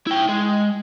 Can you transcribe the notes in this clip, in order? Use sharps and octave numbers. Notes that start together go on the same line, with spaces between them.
E4 G5
G#3